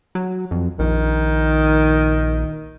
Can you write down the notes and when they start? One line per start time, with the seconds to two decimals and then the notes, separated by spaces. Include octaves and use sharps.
0.15 F#3
0.51 F2
0.79 A#1 D#3